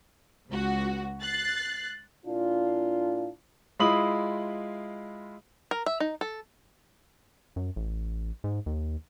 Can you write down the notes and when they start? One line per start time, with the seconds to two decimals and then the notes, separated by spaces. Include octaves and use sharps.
0.49 C#2 F#4
1.21 F#6 A6 C7
2.26 A#2 D4 E4 F4
3.80 G#3 E4 F4 B5 D#6 F#7
5.71 A#4
5.86 E5
6.00 D#4
6.21 A4
7.56 F#2
7.76 A1
8.44 G#2
8.66 D#2